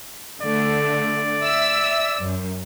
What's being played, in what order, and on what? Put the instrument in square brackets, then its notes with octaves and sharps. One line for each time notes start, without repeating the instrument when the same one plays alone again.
[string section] D3 A3 [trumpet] D5
[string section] E5 E6
F#2